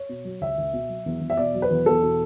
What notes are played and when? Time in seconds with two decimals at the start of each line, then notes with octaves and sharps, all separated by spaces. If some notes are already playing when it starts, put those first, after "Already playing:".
Already playing: C#5
0.09 B2
0.25 F#3
0.41 C#2 E5
0.58 C#2
0.73 B2
0.89 F#3
1.06 E2
1.21 E2
1.30 E5
1.37 B2 D5
1.54 F#3
1.62 B4
1.70 E2
1.86 E2 A4
2.02 B2